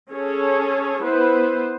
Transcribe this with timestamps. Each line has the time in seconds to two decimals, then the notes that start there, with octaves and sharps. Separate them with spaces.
0.11 C#4 G#4 A4 C#5
1.03 B3 E4 B4 C5